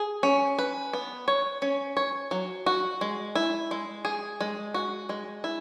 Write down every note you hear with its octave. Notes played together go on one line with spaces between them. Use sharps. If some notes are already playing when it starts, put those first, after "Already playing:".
Already playing: G#4
C#4
B4
B3
C#5
C#4
C#5
F#3
F#4
G#3
E4
G#3
G#4
G#3
F#4
G#3
E4